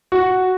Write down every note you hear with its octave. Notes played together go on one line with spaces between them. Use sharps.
F#4